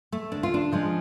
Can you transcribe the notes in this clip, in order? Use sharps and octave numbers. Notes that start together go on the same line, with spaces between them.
A3
D2 D4
F4
D4
C#3 F3 G#3